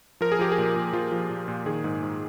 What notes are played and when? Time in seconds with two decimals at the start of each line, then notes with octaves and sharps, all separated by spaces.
0.21 F3 A#4
0.32 G#4
0.39 F3 G4
0.52 G#4
0.58 A#2
0.76 A#2
0.93 F3 F4
1.12 F3
1.30 A#2
1.48 A#2
1.66 D#3 G#4
1.84 G#2
2.03 G#2